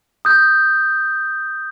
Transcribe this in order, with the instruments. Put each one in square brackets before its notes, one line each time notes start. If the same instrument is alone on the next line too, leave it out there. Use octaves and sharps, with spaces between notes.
[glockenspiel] D#6 G6